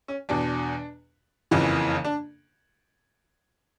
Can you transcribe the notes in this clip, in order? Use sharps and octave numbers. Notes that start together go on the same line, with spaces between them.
C#4
E2 B2 D4
F#1 F2 C#3 E3
D4